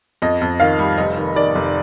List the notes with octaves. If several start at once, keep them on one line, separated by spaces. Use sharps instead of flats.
F2 D#5
F2
D#3 F5
G3
F1 D#5
D#3
D#3 D5
F1